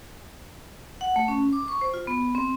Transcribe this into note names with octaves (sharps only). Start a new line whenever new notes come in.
F#5
A3
C#4
D6
C#6
C5
F4
B3
C4